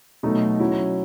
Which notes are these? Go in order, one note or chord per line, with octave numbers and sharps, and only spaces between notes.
B2 F#3 A3 D#4
F#3 C#4 E4